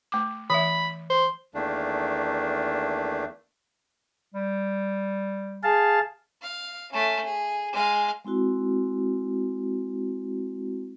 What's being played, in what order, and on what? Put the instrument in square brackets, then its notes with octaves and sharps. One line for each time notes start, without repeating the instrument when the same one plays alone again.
[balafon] A3 D6
[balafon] E3 E5 [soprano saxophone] B5
[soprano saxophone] C5
[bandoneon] E2 D#3 A3 A#3 D4
[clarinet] G3
[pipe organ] G#4 F5 A5
[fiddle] F5
A3 C#4
G#4
G#3 F5
[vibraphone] G#3 C4 E4 F#4